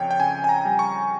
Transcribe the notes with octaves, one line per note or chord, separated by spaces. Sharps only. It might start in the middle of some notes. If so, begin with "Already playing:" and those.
Already playing: F2 C#3 C#5 G5
G5
C#3 G#5
G#5
A#5
G3
C#6